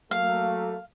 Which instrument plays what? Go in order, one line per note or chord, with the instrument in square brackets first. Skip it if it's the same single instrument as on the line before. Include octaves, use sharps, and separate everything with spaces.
[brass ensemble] F#3 A3 A#3 [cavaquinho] F5